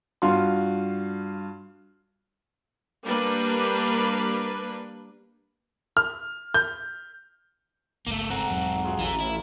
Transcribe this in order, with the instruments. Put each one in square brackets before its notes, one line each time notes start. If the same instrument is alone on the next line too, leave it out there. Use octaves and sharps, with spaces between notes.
[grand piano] G2 F4 F#4 C6
[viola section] G3 A#3 D4 B4
[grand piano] F6
G6
[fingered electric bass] G1 C#2 [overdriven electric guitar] A3 A#3
[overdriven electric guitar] G#2 C4 [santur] A4 A#4 F#5
[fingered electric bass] E1 F#3
[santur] F4 F#4 G#4
[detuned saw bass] A1 [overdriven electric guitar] E3 [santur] F5 A5 A#5
[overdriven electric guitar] E4